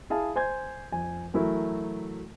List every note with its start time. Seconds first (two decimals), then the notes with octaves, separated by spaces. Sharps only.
0.10 E4 G#4 F5 A5
0.36 C5 G#5 G6 G#6
0.92 F2 G#5
1.34 E3 F#3 A3 E4 A#4